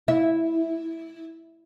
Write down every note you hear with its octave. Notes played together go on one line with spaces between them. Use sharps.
E4